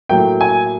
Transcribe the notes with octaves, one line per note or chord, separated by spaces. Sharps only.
A2 F#3 A#3 G5
G#5